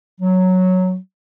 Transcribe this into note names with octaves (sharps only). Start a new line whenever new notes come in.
F#3